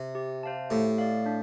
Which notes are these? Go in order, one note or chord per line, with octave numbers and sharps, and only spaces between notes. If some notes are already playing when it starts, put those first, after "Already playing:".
Already playing: C3
G4
C5 F5 A5
A2 G4
D5 F5
D4